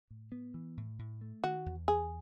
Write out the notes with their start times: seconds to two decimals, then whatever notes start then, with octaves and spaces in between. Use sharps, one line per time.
0.10 A2
0.32 B3
0.54 E3
0.77 A2
0.99 A2
1.21 A3
1.44 D#3 F#4
1.66 E2
1.88 E2 G#4